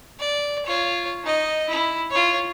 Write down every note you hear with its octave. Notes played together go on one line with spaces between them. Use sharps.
D5
F4 C#5
D#4 D#5
E4
F4 C#5